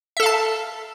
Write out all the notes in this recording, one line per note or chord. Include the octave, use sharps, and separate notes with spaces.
A4 E5 F5 A5